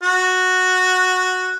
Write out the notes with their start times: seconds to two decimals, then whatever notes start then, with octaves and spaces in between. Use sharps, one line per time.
0.03 F#4